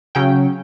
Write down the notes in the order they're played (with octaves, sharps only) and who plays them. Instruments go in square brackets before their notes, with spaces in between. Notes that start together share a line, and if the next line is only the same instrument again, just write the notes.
[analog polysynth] C#3 F#3 C#4 G5